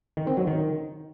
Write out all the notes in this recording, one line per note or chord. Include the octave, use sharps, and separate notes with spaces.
D#3
C4
F#3
D#3